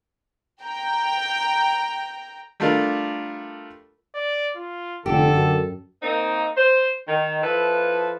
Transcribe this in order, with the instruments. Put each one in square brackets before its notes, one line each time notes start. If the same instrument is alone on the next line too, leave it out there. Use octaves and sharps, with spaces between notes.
[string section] G5 A#5
[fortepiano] G3 A3 D4 F4 A#4
[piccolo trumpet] D5
F4
[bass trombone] F1 [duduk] D3 [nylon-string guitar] G4 [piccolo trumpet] A4
[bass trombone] F#2
[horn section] A#3 C4 D#4
C5
D#3
F3 E4 A4 B4